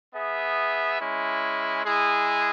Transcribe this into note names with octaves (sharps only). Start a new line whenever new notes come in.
B3 G#4 E5
G#3 C#4 E4
G#3 E4 G#4